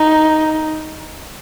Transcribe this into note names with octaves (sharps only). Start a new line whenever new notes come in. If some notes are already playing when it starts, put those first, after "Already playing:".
Already playing: D#4